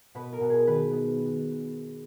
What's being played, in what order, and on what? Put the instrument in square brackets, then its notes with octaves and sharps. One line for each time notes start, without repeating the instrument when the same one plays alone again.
[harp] B2 B4
A#4
B2
G#4
D#3 B4
B3